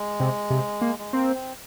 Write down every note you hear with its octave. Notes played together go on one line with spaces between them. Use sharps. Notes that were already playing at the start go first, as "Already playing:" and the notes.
Already playing: G#3
C3
C3
A#3
G#3
A#3 C4
C4